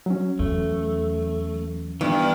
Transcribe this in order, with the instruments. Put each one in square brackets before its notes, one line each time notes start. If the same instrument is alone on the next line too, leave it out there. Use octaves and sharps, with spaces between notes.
[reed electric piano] F#3 C#4
[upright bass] E2 [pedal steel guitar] A3
[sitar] G2 [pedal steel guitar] E3 B3 F6